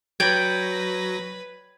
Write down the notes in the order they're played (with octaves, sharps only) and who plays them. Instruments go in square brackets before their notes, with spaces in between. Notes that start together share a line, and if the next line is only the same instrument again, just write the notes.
[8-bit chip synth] F#3 A#6 [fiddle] B4 [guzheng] C#5 D5 G5 [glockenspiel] G#6